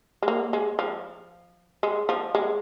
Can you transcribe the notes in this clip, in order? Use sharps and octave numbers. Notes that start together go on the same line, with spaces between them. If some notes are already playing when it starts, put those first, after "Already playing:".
G#3
A#3
G#3
F3
G#3
F3
G#3